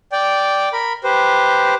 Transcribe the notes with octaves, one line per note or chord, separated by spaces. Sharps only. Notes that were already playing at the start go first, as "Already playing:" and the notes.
D5 G5
A#4 B5
G4 B4 C5